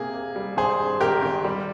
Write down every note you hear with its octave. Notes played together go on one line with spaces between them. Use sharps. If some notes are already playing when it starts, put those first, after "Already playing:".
Already playing: C3 A#3 G#4
A#3
G3
G#1 G#4 C5
G2
G#1 G4 A#4
G#1
G3